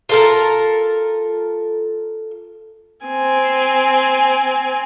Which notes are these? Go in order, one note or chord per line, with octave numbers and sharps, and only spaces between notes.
F4 A4 A#4
C4 G#5